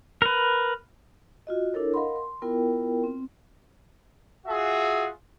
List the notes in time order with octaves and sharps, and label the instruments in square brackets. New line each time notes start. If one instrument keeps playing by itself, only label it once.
[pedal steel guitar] A#4 B4
[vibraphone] F4 F#4 D#5
D4 E4 A4 A#4 C#5
A#4 D#5 F5 F#5 B5 C6
C6
B3 E4 F4 A#4 G5
C4
[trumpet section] F4 F#4 G#4 E5